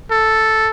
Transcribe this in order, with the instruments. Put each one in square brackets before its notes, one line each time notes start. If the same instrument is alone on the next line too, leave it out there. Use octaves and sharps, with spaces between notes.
[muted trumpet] A4